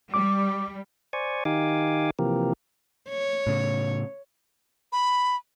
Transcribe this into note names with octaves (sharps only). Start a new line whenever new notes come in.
G3 D6
C5 D5 G#5 C#6
D#3 D#4 G4 F5 G#5 D6
C3 E3 F3 A#3 G4 A#4
C#5
A2 C#3
B5